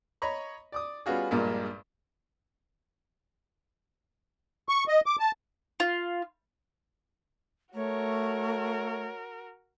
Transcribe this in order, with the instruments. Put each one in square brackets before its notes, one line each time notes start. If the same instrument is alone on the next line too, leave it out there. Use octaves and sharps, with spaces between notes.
[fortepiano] C#5 D#5 A#5 B5 C#6
D5 D6 D#6
G3 B3 C#4 F4 F#4 G#4
A#1 G2 A#2 G#3 A#3
[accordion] C#6
D#5
D6
A5
[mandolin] F4
[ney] A3 [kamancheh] F#4 A#4 [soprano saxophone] C#5